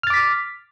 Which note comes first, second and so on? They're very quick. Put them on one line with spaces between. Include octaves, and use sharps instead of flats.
F6 A6 D6 B6